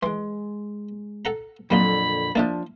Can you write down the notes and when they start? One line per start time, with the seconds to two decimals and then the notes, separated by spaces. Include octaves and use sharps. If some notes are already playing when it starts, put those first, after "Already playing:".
0.03 E3 G#3 C6
1.25 A4 F#5 A#5
1.70 F2 A#2 D3 F#3 A#3 D#4 B5
2.35 F3 A#3 D4 E4 A5